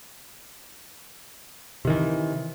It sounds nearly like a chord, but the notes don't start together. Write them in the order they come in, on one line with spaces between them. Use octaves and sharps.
C3 D#3 E3